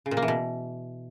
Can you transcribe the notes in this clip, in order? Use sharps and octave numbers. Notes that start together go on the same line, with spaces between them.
C#3
A#2
A#3
E3
B2